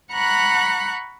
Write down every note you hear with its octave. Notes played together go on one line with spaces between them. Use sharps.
F#5 A#5 B5 C#6 F#6